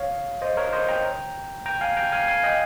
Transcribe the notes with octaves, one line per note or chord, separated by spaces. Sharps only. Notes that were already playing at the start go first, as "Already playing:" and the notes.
Already playing: C#5 F5
C5 D#5
A#4 C#5
C5 D#5
G5 A#5
G5 A#5
F5 G#5
G5 A#5
F5 G#5
F5 G#5
D#5 G5